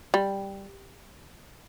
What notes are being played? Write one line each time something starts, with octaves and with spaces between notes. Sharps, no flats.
G3